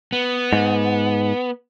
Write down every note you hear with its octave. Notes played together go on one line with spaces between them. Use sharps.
B3
G#2